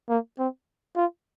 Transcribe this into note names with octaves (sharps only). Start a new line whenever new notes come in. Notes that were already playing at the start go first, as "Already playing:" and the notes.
A#3
C4
F4